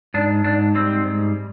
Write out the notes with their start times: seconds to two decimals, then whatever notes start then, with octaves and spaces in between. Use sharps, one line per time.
0.14 G#2 D4
0.44 G#2 D4
0.75 G3 C4
1.05 G#2